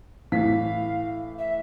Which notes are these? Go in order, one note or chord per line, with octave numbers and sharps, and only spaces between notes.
A2 E3 F5 B6
E5